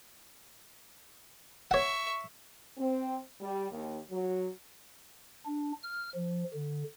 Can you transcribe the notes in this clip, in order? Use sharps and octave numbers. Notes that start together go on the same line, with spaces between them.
C#5 E5 F#5 C#6
C4
G3
D#2
F#3
D4
F6
F3
D3